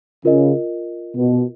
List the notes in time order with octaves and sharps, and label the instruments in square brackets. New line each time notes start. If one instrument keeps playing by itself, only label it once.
[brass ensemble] C#3 [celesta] F4 A#4 D#5
[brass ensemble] B2